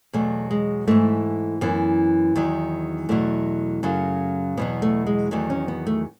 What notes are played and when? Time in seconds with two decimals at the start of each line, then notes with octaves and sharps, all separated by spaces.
0.13 E2 B2 F#3 A3
0.51 G#3
0.87 G#2 E3 A3
1.61 F#2 E3 B3
2.36 E2 D#3 F#3
3.09 E2 B2 F#3 A3
3.83 F#2 C#3 F#3
4.57 E2 B2 F#3 B3
4.82 A3
5.06 G#3
5.31 E2 D#3 F#3 A3
5.50 C#4
5.68 B3
5.87 A3